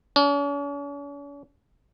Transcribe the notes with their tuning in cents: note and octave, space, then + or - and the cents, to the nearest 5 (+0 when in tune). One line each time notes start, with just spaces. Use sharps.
C#4 +45